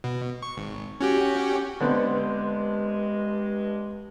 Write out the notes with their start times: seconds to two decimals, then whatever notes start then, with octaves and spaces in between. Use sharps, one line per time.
0.04 B2
0.43 C#6
0.57 G#1
1.01 C#4 F#4 G4
1.80 G2 D3 G#3 B3 C4